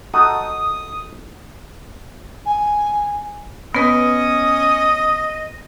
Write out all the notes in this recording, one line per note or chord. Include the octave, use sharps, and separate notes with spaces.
D#4 F#4 A4 D#6
G#5
B3 C#4 B4 D#5 D#6